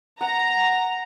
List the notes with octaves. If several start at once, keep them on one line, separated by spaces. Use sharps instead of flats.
F#5 A#5